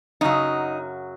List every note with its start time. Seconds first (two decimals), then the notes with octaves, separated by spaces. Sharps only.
0.21 F#2 C#3 F#3 D#4